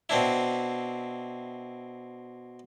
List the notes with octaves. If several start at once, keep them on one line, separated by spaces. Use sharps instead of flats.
B2 C4 D4 E4